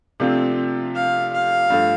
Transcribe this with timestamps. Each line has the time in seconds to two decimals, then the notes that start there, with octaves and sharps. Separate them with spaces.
0.20 C3 F3 A3 C4 D4 F4
0.95 F5
1.33 F5
1.70 G2 F3 A3